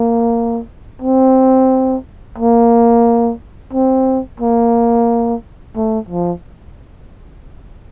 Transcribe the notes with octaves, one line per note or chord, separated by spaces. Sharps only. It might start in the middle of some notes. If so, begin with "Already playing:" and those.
Already playing: A#3
C4
A#3
C4
A#3
A3
F3